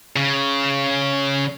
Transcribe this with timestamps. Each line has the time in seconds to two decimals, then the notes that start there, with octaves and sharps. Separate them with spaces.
0.16 C#3